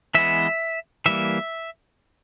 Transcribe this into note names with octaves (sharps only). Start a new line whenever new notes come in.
E3 G#3 B3 E5
E3 G3 A#3 E5